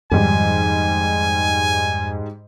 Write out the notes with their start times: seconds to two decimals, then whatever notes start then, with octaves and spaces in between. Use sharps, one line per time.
0.12 F2 G#2 D#3 G3 G#5